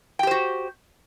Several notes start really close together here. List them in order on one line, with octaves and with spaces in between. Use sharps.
G5 G4 C5 F#4